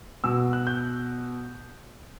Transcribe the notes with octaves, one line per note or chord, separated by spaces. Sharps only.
B2 E6
F#6
G6